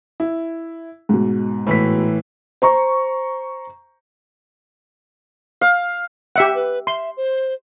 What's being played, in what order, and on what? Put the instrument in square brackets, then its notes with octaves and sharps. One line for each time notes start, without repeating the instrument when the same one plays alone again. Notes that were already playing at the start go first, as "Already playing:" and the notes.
[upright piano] E4
G#2 B2
[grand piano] A2 E3 B6
[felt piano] C5 A#5 C#6
[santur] F5
[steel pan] G4 E5 F#5
[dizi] B4
[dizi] E5 [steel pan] C6
[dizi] C5